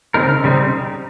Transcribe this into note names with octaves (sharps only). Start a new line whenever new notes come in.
C#3 G3 C4 D#4 A#4
C#3 G3 C4 D#4